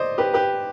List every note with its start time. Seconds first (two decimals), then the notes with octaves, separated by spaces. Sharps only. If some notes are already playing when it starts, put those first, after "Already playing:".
Already playing: C5 D5 D#5
0.18 G4 B4
0.33 G4 B4